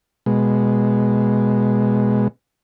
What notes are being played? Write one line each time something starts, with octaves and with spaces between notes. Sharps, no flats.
B2 G#3